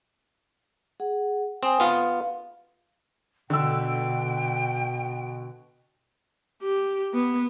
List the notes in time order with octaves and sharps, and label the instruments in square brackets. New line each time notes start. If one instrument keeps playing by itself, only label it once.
[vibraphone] G#4 F#5
[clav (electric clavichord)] C4 [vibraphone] G5 G#5 D#6
[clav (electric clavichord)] B3 F4 [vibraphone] F5
[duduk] B2 [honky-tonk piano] D3 E6 [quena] G5
[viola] G4
B3